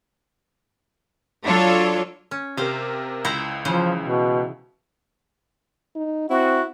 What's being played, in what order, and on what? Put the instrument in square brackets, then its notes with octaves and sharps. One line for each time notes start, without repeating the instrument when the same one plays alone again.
[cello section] F#3 D4 F4 A4 C#5
[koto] C#4
[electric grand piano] C3 G4 A#4 [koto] C5 F5
[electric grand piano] C#2 [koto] E4 C5 A#5
[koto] C#3 E3 C5 [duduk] F3
[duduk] B2
[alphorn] D#4
[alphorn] C4 [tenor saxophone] E4 [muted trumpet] F#4